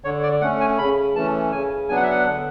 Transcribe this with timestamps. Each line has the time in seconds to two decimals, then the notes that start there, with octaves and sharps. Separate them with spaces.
0.04 D3 C#5
0.23 D5
0.41 A3 C#4 F#5
0.60 G#5
0.78 C#3 B5
1.15 E3 A3 C#4 A5
1.52 C#3 G#5
1.89 F#3 B3 D4 G#5
1.96 F#5
2.03 E5
2.11 F#5
2.26 D3